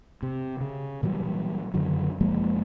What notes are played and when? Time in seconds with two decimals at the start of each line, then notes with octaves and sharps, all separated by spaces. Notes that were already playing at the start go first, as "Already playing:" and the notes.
0.23 C3
0.61 C#3
1.03 A#2 E3 F#3 G3
1.74 F#2 D3 D#3 F#3
2.21 F#1 F3 G#3 A#3